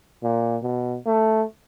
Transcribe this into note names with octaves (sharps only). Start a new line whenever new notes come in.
A#2
B2
A3